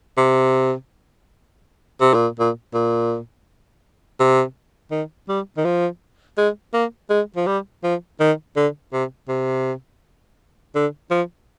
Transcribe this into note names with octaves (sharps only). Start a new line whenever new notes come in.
C3
C3
A#2
A#2
A#2
C3
D#3
G3
D#3
F3
G#3
A#3
G#3
F3
G3
F3
D#3
D3
C3
C3
D3
F3